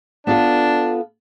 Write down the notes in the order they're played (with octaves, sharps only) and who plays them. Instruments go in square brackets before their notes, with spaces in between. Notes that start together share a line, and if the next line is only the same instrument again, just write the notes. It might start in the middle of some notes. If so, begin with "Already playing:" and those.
[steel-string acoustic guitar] B3 F4 A4 [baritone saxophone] D4